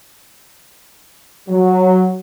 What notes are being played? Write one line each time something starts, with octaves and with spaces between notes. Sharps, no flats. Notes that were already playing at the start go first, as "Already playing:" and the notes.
F#3